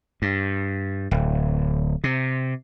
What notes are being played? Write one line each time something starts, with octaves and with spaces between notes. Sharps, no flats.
G2
D1
C3